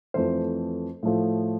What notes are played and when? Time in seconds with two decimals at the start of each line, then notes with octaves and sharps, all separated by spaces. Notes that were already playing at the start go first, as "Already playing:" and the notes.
0.14 F2 E3 A3 C5
1.03 A2 F3 A3